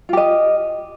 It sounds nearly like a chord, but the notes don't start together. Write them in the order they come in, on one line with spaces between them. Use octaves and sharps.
F4 G4 D#5